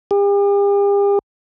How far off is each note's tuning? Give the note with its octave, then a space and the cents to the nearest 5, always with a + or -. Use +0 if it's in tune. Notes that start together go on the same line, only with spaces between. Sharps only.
G4 +45